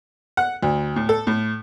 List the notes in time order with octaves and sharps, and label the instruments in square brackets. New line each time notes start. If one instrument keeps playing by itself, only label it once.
[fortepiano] F#5
D2
A2
A4
A2